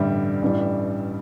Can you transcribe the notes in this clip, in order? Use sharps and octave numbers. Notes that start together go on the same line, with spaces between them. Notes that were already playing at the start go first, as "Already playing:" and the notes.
Already playing: A1 G2 D3 G3 E5
A1 G2 E3 G3